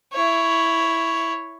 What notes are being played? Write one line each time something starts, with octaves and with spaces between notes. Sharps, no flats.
E4 C#5